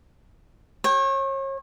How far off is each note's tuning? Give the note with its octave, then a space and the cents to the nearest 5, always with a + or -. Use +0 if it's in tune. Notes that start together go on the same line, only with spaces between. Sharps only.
C#5 -35 G5 +0